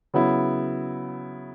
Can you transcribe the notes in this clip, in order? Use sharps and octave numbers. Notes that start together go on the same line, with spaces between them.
C#3 F#3 B3 E4